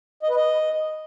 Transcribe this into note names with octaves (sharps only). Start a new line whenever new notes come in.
D#5
B4
D#5